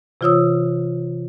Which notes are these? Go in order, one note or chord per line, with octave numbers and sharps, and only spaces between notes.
C3 E3 F4 C#5 D#6 E6